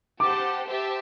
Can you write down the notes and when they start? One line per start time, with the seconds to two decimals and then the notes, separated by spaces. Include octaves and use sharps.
0.20 G4 C5 F#5 A5 D6
0.68 G4 C5 E5 A5